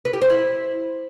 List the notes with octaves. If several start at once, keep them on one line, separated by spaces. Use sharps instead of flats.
B4
G4
C5
E4